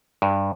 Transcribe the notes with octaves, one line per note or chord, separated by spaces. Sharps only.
G2